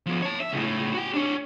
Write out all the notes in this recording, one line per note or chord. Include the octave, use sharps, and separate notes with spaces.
F3 B3
C#5 A5
E5
C#2 A2
F#4 G5
D4 C#5